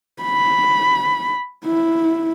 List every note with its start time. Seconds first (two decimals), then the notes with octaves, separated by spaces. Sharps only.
0.23 B5
1.65 E4